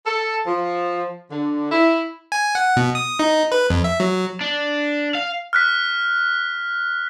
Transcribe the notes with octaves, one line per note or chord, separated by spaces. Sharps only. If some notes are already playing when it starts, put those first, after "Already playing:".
A4
F3
D3
E4
G#5
F#5
B2
D#6
D#4
B4
F2
E5
F#3
D4
F5
F6 F#6 B6